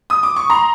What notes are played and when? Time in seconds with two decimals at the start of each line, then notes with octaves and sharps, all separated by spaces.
0.10 D#6
0.23 D6
0.36 C#6
0.50 A#5 C6